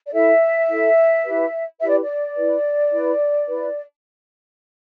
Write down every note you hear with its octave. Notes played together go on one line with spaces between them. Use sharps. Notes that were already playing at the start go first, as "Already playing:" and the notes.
D5
E4 A4 E5
E4 A4
E4 G4 B4
E4 G4 B4 E5
D5
D5
E4 B4
E4 B4
E4 B4